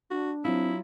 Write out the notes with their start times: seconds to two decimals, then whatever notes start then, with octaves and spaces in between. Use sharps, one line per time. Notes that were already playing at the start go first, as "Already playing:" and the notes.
0.11 D4 F#4
0.45 F#3 C4 E4 F4